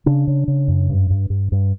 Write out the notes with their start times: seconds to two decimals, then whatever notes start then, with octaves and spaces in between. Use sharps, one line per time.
0.06 C#3 D4
0.27 C#3
0.48 C#3
0.68 F#2
0.89 G2
1.10 G2
1.30 G2
1.52 G2